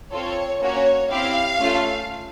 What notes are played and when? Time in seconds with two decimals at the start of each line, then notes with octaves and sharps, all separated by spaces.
0.11 C4 F4 A4 C#5
0.60 A#3 C#4 F#4 C#5
1.09 C4 E4 G4 F5
1.59 A3 C#4 F4 A4